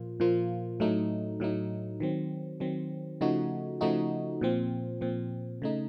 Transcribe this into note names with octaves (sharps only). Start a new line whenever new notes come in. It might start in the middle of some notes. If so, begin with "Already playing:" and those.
Already playing: A#2 F3 A#3 F4
A#2 F3 A#3 F4
A2 F#3 A3 D#4
A2 F#3 A3 D#4
D#3 F#3 C4
D#3 F#3 C4
C#3 F3 A3 D#4 F#4
C#3 F3 A3 D#4 F#4
A#2 F3 C4
A#2 F3 C4
C#3 A3 D#4